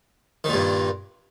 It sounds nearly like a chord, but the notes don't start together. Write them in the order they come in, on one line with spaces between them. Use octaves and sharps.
D#3 A#2 G2